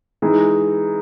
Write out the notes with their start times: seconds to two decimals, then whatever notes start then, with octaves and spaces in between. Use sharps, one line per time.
0.22 E3 G#3 D#4 G#4